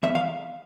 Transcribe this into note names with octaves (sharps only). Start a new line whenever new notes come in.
E2 E5
F5